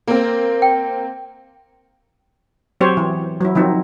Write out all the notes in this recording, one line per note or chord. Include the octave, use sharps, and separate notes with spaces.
A#3 C4 A#4
G5
F#3 C4 G4 C5 C#5
E3
F#3 E4
D#3 F3 F#3 C4 D#4